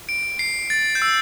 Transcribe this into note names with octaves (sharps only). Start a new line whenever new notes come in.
D7
C7
A6
G6
E6